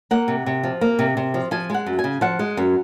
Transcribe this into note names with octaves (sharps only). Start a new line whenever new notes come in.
A#3 F#5
C3
C3
F3
A#3
C3
C3
F3
F3 G#5
G#3 F#5
F#2
G#5
C#3
F3 F#5
G#3
F#2